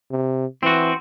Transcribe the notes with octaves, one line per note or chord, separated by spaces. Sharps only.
C3
E3 C4 F#4